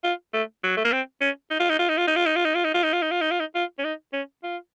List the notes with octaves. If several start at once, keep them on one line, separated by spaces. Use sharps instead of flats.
F4
A3
F#3
A3
A#3
C4
C#4
D#4
F4
D#4
F4
D#4
F4
D#4
F4
D#4
F4
D#4
F4
D#4
F4
D#4
F4
D#4
F4
D#4
F4
D#4
F4
C#4
D#4
C#4
F4